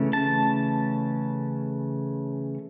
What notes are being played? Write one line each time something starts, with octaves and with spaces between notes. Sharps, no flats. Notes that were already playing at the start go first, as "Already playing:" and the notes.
Already playing: C#3 E3 A3 C#4
A5